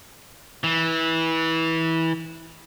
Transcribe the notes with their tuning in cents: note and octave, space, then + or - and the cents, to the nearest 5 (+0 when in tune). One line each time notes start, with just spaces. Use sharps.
E3 -20